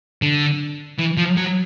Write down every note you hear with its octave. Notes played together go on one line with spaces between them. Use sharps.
D3
E3
F3
F#3